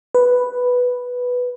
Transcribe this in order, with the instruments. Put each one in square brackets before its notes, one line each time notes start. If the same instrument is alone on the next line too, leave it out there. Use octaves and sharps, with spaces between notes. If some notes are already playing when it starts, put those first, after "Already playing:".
[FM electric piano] B4